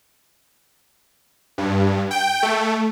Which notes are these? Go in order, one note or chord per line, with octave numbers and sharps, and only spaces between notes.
G2
G5
A3